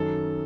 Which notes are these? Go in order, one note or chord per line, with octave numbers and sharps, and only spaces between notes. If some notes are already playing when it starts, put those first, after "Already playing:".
Already playing: F#2 D#3 A4